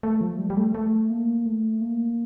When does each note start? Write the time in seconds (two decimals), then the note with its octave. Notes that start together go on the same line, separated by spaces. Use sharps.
0.03 A3
0.21 F3
0.39 G3
0.50 G3
0.57 A3
0.75 A3
1.10 A#3
1.46 A3
1.81 A#3